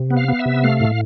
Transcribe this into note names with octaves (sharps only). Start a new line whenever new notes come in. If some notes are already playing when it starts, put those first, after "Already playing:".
Already playing: C3
B3
F5
B3
E5
C3
A3 F5
A2